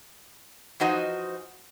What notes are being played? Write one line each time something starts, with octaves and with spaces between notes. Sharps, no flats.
E3 F3 D#4 F#4 C5 D#5